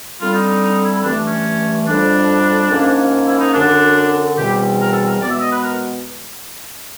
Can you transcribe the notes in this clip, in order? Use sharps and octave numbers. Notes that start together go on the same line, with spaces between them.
D3 G3 C4 F4
D#4
D#4
D#4
E4
G2 E3 A3 D4
C#4
F2 D3 G3 D4
G#2 F3 A#3 C#4
E4
D#4
F#2 D3 F#3 D4
E2 B2 G3 C4 G4
A#4
A4
A#4
B2 G#3 B3 D5
E5
D#5
B4
A#4